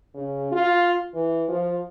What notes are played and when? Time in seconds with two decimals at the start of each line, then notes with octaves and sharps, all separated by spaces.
0.15 C#3
0.52 F4
1.14 E3
1.49 F3